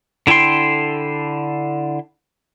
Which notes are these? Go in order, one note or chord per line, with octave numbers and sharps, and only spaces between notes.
D3 E4 A4 G5 C6